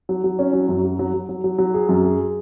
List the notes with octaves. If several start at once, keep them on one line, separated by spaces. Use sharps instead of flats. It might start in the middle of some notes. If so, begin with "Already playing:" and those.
F#3
F#3
C#4
F#3
F#2
F#3
F#3
F#3
F#3
F#3
F#3
G#4
F#2
G#4